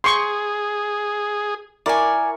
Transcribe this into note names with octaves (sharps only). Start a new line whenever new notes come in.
G#4 C6 C#6
E4 A#4 D5 G#5 C#6